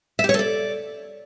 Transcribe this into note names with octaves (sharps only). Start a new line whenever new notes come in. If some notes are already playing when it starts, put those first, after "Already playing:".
E5
G4
C#5
A4
D5